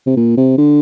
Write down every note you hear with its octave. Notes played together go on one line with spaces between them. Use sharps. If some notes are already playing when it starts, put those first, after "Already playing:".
C3
A#2
C3
D3